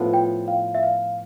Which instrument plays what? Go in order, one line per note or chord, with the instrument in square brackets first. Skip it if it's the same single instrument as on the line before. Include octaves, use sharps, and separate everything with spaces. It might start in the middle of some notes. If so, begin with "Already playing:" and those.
Already playing: [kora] A2 F3 B3
[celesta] G5
F5
E5
F5